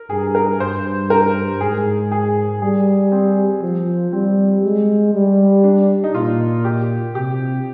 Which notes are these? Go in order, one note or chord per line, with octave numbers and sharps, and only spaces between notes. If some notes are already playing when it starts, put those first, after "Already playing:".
Already playing: A#4
G2 G#4
A#4
G2 C5
A#4
G#2 G#4
G#4
G3 G#4
C4
F3
G3 C4
G#3
G3
D4
D#4
A#2 F4
G4
C3 G4